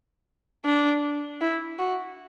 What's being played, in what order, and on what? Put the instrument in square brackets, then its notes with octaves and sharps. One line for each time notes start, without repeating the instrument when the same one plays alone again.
[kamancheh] D4
E4
F#4